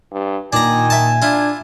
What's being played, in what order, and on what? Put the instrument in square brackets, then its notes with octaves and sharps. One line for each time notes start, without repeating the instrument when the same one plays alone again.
[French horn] G2
[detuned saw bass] A#2 [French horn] D#3 [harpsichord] D4 A#5 [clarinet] G#5
[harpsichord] E5 A5
[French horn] D4 [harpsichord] E4 F4